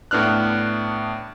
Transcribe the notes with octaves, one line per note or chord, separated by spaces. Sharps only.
A2 B3 D4 F6 F#6